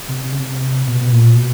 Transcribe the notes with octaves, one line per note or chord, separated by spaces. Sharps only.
C3
C3
C#3
C3
B2
B2
A#2
B2